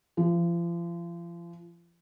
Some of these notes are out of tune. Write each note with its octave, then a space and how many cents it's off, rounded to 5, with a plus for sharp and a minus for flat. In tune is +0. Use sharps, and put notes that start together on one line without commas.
F3 -35